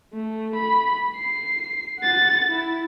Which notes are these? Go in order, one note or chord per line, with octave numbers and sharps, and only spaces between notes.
A3
B5
C7
F#5 A6
E4